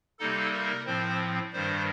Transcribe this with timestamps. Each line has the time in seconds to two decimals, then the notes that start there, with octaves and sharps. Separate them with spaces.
0.19 C3 G3 A#3 D#4 A4
0.53 A#4
0.86 A2 F3 C4 C5
1.53 G2 D#3 G3 C5